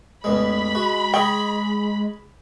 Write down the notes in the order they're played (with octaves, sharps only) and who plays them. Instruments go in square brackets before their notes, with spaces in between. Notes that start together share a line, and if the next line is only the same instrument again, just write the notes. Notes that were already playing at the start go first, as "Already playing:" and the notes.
[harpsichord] A1 E2 G#3 [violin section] B5
[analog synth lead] G#3 [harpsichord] F#4
[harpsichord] G#4 A#5 C#6 [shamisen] G5